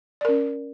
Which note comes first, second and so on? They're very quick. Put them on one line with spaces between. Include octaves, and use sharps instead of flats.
D5 A#4 C#4